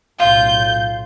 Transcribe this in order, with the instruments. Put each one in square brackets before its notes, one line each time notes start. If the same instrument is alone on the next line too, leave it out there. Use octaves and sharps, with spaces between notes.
[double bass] B1 A2 [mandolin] F4 [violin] G6